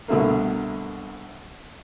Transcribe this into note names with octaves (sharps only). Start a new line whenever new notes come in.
C2 B2 D3 A3 A#3